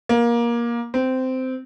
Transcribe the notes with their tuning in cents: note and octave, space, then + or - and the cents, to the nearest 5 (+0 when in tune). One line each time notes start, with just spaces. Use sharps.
A#3 +20
C4 -15